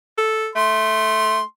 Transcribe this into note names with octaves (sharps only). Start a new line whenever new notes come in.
A4
A3 C6